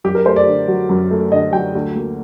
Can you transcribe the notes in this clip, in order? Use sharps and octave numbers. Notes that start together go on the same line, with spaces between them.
F#2 G4
A#4
A3 C5
D5
D3
F#3
F#2
A3
D3 D#5
F#3 G5
D2
A#3